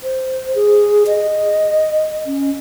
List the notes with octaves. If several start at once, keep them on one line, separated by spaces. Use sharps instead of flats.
C5
G#4
D#5
C#4